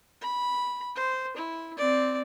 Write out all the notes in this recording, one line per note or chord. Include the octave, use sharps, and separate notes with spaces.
B5
C5
E4
C4 D5